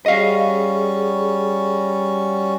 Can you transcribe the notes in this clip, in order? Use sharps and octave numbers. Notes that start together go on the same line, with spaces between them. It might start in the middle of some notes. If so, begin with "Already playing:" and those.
G3 C#4 F#4 G#4 D#5 F5